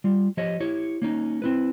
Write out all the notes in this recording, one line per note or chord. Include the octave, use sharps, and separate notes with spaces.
G3 F4
F3 G4 C#5 D#5
E4 G4 C#5
A#3 C#4 D#4
C4 E4 B4